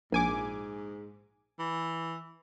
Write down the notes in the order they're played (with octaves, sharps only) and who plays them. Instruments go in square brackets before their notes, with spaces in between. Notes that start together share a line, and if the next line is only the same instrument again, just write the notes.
[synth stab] A#1 G#5 D6 [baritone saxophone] G#2
[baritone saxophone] E3